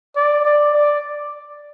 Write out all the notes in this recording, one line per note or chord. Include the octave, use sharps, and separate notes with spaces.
D5
D5
D5